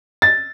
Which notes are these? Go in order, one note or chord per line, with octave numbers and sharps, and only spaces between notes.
A6